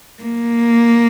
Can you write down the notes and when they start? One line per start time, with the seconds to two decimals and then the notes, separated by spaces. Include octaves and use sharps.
0.23 A#3